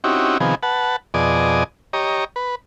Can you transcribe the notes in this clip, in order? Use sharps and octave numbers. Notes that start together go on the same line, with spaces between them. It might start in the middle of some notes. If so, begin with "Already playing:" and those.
C4 C#4 D#4 E4 F#4 G4
C3 D#3 F3 B3 G#4
B4 F#5 A5
F2 B2 G#4 D5 D#5
G4 C#5 D#5 A#5
B4